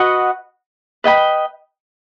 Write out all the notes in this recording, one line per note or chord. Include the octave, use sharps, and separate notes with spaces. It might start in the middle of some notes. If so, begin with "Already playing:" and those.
Already playing: F#4 B4 D#5 F#5
B4 D#5 G5 B5